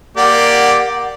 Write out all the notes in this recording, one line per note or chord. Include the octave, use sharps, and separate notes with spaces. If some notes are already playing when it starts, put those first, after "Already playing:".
A#3 G4 D5 F#5